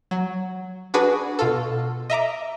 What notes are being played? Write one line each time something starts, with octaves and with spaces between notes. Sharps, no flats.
F#3
D4 F#4 G#4 B4
B2 F4 A4
D#5 E5 A#5 D6